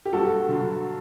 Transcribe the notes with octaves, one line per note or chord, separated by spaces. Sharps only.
G4
G2 F#4 A4
D3 F#3